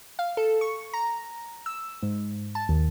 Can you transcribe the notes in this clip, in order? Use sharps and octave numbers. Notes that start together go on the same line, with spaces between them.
F5
A4
C#6
A#5
E6
G#2
A5
D#2